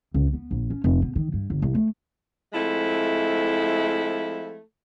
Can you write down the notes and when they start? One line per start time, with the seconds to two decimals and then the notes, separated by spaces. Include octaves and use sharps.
0.14 C#2
0.33 B3
0.51 A#1
0.70 C#4
0.84 F1
1.02 B2
1.16 D#3
1.33 G2
1.50 G1
1.62 C2
1.75 A3
2.53 F3 G#3 A3 C4 E4